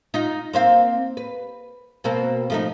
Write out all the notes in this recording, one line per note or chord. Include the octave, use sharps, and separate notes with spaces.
D#4 F4
A#3 C4 F5
B4
B2 A#3 C4
F3 A3 D#4